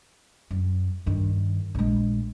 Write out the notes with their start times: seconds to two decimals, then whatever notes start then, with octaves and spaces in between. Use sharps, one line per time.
0.51 F#2
1.06 G2 D#3
1.75 A#1 G#3